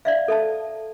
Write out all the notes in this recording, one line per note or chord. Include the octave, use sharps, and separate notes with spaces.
D5 E5 F5
A4 E5 A5